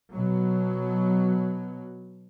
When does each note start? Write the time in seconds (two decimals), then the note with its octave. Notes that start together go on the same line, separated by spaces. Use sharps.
0.13 B2 F#3